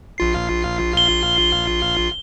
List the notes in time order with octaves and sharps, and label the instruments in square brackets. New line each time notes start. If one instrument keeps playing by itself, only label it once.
[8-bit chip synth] A#1 F4 C7
[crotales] G7